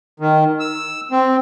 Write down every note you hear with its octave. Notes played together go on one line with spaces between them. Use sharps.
D#3
E6
C4